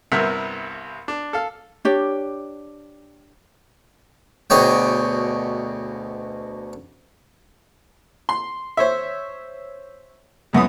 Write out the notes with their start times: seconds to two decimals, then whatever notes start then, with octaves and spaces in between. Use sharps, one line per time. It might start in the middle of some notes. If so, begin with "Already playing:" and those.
0.12 C2 G2 C3 B3 A#4 E5
1.08 D4
1.33 A4 F5
1.85 D4 G4 C#5
4.50 D2 B2 G#4 C#5 G5
8.29 C6
8.77 C5 C#5 E5
10.53 C#2 F#2 B3 D#6